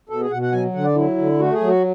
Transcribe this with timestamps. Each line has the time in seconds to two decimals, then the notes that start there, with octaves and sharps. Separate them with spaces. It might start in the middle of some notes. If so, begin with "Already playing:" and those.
0.09 B2 A4
0.21 G#4
0.31 B2 F#5
0.42 F#5
0.52 F#3 G#5
0.74 D3 F#5
0.84 D5
0.96 F#3 E4
1.17 D3
1.39 A3 F#4
1.53 G#4
1.60 F#3
1.67 F#4